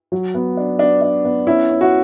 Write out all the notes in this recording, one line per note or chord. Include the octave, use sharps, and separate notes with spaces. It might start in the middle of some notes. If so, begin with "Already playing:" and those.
F#3
B3
D4
B3 D4
D4
B3
C#4 E4
C#4
F#4